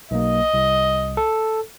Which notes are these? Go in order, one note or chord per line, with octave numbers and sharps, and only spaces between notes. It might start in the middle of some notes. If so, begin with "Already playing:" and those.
B1 A#3 D#5
C2
A4